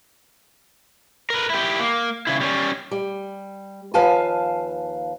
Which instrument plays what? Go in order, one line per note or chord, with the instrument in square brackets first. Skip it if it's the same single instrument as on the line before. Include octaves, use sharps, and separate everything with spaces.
[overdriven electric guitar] A#4 B4
E4 G4
A#3
C#3 E4
G3 C#4
[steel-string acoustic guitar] G3
D#2 F3 B4 F5 G#5 A5